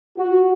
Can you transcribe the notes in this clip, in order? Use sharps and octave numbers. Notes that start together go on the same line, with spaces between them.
F#4